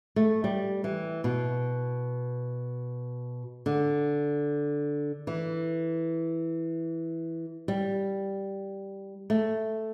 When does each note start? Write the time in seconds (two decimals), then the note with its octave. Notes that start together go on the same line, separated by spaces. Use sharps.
0.16 A3
0.44 G3
0.84 E3
1.24 B2
3.66 D3
5.27 E3
7.68 G3
9.30 A3